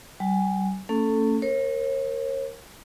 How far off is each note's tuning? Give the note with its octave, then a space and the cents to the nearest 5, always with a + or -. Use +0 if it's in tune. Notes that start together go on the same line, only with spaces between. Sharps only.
G3 -40 G#5 +0
A3 +40 C#4 +0 A4 +0
A#4 +0 C#5 -40